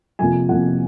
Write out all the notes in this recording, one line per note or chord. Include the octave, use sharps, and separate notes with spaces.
F2 C3 F3 A#3 G#5
F2 C3 F3 A#3 F#5